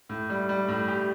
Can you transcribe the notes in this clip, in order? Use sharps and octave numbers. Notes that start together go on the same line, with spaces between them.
A2
G3
G3
A2
G4